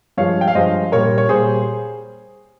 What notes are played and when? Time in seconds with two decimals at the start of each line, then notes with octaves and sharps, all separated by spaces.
0.17 G2 F3 G#3 C#5 F5
0.41 G5
0.47 F5
0.55 G2 F3 G#3 C5 D#5
0.92 A#2 G3 A#4 C#5
1.18 C#5
1.29 A#2 G3 G#4 C5